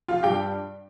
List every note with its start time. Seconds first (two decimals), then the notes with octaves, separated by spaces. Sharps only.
0.08 F3 F4 F5
0.23 G2 G4 G5